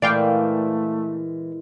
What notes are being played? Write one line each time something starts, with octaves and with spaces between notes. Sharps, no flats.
A#2 E3 G#3 A3 D5 F5 G5